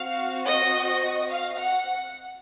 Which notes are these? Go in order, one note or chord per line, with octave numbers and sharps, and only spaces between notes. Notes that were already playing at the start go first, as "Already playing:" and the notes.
Already playing: C4 F#4 F5
D#5
D#5
F5
F#5